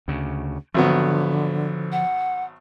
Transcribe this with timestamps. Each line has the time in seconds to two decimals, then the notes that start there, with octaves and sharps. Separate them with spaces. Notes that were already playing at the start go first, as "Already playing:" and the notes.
0.08 D2 C#3
0.74 G#1 D3 F3 F#3 B3
1.92 F#5